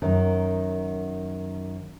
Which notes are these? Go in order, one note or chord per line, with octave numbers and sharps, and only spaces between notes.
F#2 D#3